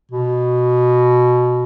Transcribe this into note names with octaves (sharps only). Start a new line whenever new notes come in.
B2